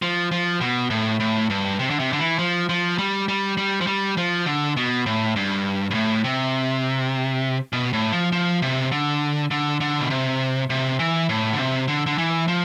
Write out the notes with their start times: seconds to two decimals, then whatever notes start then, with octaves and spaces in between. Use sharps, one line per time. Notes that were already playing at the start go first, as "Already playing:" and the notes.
0.02 F3
0.32 F3
0.61 B2
0.90 A2
1.20 A2
1.50 G2
1.79 C3
1.90 D3
2.00 C3
2.13 D3
2.19 E3
2.39 F3
2.69 F3
2.98 G3
3.28 G3
3.57 G3
3.81 F3
3.87 G3
4.17 F3
4.46 D3
4.77 B2
5.06 A2
5.36 G2
5.91 G2
5.94 A2
6.24 C3
7.73 B2
7.93 A2
8.12 F3
8.32 F3
8.62 C3
8.92 D3
9.51 D3
9.81 D3
10.00 B2
10.10 C3
10.70 C3
10.99 E3
11.29 A2
11.53 D3
11.58 C3
11.88 D3
12.06 D3
12.18 E3
12.48 F3